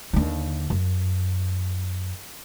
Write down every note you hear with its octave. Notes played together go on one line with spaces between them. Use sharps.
D#2 D3
F#2